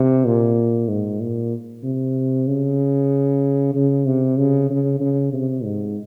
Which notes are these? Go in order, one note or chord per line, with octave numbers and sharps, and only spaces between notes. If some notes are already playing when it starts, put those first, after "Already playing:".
Already playing: C3
A#2
G#2
A#2
C3
C#3
C#3
C3
C#3
C#3
C#3
C3
G#2